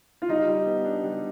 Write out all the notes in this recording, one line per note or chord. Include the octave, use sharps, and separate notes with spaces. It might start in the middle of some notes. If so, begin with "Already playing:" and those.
F4
G3 D#4
G3
B3
D4
G3